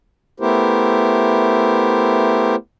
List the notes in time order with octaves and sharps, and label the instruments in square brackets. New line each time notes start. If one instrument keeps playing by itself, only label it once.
[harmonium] A3 B3 E4 G4 A#4 C5